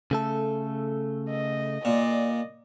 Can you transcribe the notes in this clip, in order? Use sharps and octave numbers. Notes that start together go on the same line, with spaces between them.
C#3 A3 A4
D#5
A#2 D5 D#5